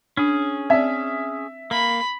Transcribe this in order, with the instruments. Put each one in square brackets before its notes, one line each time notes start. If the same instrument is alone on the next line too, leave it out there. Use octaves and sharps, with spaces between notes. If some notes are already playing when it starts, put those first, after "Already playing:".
[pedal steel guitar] C#4 G#4 [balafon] D4
[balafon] C4 D5 [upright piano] E5
[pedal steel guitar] A#3 [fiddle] B5